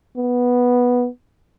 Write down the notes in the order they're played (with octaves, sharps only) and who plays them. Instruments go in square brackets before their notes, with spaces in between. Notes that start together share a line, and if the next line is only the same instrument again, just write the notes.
[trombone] B3